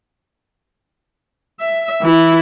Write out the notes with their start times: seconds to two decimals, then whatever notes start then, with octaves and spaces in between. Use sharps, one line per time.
1.61 E5
2.02 E3 E4